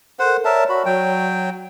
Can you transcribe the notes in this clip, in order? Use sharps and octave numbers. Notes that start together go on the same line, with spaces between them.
A4 A#4 C5 F#5
A#4 C#5 D5 E5 A5
F#4 B5
F#3 G5